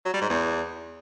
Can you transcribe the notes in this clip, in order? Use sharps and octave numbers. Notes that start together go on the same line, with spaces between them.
F#3
G3
G#2
E2